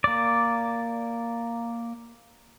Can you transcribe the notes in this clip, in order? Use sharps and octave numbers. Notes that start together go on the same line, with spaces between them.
A#3 D5